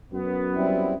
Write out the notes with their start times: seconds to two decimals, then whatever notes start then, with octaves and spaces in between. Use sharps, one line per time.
0.13 F#2 B3
0.54 G3 C4 E4